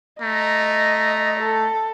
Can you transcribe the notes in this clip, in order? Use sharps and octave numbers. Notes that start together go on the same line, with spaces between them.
A3 D#5 A#5
A4